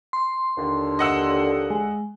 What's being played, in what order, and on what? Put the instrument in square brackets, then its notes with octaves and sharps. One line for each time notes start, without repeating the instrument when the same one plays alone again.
[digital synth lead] C6
[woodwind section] D#2 D3
[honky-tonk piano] D#5 F#5 E6
[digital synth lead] G#3